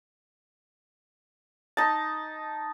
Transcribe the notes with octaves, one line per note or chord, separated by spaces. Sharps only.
D#4 A5